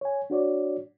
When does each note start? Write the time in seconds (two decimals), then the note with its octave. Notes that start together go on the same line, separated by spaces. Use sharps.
0.01 C#5 G#5
0.30 D4 F#4 C#5 D5